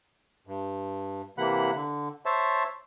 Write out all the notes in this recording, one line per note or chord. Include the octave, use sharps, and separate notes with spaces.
G2
C3 E3 A#3 F#5 B5 F#6
D3
C5 C#5 E5 A5